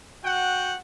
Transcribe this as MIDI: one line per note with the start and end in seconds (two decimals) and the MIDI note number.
0.24 0.76 66
0.24 0.76 78
0.24 0.76 79